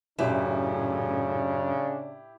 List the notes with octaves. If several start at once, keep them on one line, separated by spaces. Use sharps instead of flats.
F#2 A2 C#3 D4 E4 G4